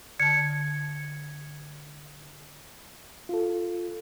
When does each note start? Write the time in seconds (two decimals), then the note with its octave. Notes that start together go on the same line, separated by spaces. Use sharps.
0.20 D3 A5 G#6 C#7
3.29 F4 A4